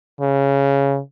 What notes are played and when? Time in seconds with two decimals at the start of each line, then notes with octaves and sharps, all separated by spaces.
0.21 C#3